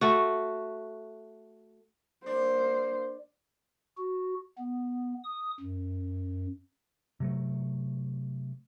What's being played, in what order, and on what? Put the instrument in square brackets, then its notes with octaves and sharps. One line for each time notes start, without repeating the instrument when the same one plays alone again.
[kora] A3 F#4
[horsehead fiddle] A#3 C5 [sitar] D4
[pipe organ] F#4
B3
D#6
F#2
[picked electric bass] C3 F#3 A3